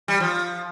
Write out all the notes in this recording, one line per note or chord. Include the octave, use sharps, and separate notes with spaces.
G3
F3